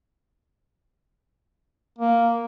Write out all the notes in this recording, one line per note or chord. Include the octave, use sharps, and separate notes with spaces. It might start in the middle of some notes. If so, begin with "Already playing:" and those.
A#3